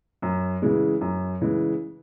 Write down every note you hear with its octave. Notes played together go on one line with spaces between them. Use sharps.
F#2
C#3 E3 G#3
F#2
C#3 E3 G#3